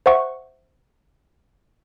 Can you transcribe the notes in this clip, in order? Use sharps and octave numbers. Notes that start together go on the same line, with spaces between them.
C5 E5 F#5 C#6